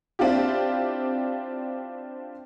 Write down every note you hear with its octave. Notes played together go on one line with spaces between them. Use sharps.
C4 D4 E4 F4 G4